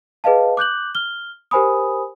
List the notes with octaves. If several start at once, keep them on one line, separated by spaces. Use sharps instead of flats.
G#4 B4 D#5 F5 A5
D6 F#6 G6 F#7
F6 G7
G4 A#4 C5 G#5 B5 D#6